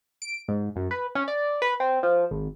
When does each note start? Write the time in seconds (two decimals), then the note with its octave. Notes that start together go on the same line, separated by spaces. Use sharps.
0.22 D7
0.48 G#2
0.76 F#2
0.91 B4
1.15 C#4
1.28 D5
1.62 B4
1.80 C4
2.03 F3
2.31 G#1